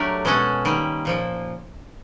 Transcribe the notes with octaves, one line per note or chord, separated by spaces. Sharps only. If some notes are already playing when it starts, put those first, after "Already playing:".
Already playing: F#3 A3 D4 G4 A#4
B2 G#3 C#4 F#4 A4
D#3 G3 A#3
A#2 F3 A#3